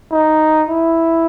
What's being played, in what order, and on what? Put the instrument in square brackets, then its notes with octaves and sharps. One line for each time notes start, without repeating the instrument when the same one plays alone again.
[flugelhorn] D#4
E4